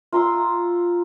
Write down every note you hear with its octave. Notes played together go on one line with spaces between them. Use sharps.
F4 A#5 C6 E6